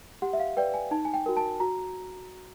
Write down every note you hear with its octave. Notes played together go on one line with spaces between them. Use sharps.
G4 F#5
E5
F5
B4 D5 G5
G#5
D#4 A5
G#5
G5
F#4 A#4
A5
F#4 A#5